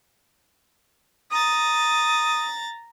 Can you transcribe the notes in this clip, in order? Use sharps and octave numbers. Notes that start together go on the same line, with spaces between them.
A#5 D#6 A6